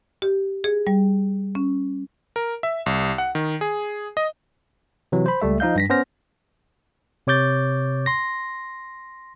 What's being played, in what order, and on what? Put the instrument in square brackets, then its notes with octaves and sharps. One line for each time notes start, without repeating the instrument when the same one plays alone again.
[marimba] G4
G#4
G3
C#4
[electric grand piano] A#4
E5
C2
F#5
D#3
G#4
D#5
[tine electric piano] C3 E3 F#3
C5 B5
C#2 G3 A3 E5
F3 D#4 D#5 F5 G6
G2 A#6 B6
B3 C#4 C5 F6 A#6
C3 C#5 D6 G6 A6
C6 A#6